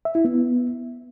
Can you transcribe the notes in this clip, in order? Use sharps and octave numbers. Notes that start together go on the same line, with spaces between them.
E5
E4
B3